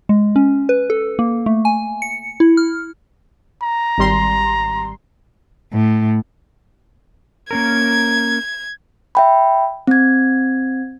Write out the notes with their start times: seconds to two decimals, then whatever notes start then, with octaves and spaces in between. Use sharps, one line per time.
0.09 G#3
0.36 C#4
0.69 B4
0.90 A4
1.19 A#3
1.46 A3
1.65 G#5
2.02 C#7
2.40 E4
2.57 F6
3.63 A#5
3.98 G#1 G3 C6
5.73 A2
7.51 A#3 C#4 A#4 G#6
9.15 E5 G5 B5
9.87 C4 G#6